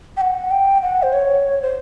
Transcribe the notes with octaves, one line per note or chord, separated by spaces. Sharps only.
G5
F#5
G5
F#5
C5
C#5
C5